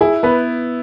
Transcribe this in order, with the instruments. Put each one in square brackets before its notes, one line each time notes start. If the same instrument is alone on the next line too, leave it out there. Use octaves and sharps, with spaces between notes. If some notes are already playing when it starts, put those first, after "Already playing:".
[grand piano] E4 [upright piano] G#4
[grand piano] B3 [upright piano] B4